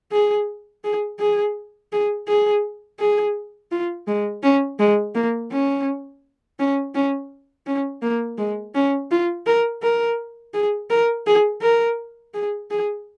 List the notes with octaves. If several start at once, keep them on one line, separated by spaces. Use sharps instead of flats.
G#4
G#4
G#4
G#4
G#4
G#4
F4
G#3
C#4
G#3
A#3
C#4
C#4
C#4
C#4
A#3
G#3
C#4
F4
A#4
A#4
G#4
A#4
G#4
A#4
G#4
G#4